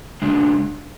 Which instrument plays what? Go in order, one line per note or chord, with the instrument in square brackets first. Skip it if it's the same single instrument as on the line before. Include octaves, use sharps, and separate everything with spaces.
[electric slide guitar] C#3 G#3 D4